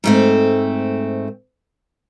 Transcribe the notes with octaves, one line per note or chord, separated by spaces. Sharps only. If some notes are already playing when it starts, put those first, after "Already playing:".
G#2 A3 C4